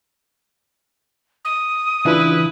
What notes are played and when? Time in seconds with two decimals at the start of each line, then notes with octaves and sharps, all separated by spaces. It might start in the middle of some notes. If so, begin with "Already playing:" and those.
1.45 D#6
2.05 C#3 E3 D4 E4 F4 B4